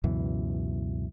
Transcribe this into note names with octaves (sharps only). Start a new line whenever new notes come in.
C#2 F#2 B2 E3